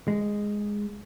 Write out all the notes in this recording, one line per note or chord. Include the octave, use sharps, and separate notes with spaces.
G#3